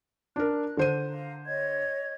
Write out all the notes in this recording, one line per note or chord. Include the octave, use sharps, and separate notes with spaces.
D4 A#4 F#6
D3 C5 D#7
F5 A#5
C#5 D#5 G#6